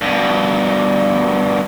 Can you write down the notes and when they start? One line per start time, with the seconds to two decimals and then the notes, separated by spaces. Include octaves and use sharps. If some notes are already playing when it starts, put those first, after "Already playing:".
0.01 G2 B2